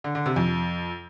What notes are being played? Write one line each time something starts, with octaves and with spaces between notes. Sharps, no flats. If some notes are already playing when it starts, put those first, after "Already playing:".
D3
D3
C3
F2